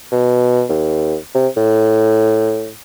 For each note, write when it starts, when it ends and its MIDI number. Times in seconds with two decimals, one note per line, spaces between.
0.12 0.64 47
0.69 1.16 39
1.35 1.48 48
1.57 2.71 45